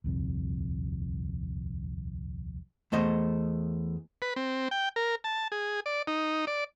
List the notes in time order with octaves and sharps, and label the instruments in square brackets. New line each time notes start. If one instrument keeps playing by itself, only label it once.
[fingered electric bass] D#1 C2 F2
[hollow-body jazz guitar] E2 A3 C5 D#5
[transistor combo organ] B4
C4
G5
A#4
A5
G#4
D5
D#4
D5